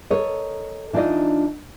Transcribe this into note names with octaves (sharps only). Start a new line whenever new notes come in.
A4 A#4 C#5 D#5
E3 D4 D#4 F4 D5 D#5